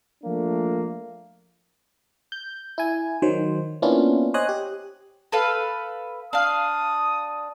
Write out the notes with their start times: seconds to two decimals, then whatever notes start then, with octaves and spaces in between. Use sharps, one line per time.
0.24 F3 A3 A#3 D4
2.32 G6
2.78 E4 G#5
3.22 D#3 F#3 C5
3.82 A#3 B3 C#4 D4 E4 F4
4.34 C5 C#5 D#5 G#5 D#6 F#6
4.49 G4
5.32 A4 B4 F5
6.33 D4 F5 D#6